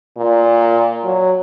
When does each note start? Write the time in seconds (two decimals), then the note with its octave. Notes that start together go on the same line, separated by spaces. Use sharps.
0.18 A#2
1.04 F#3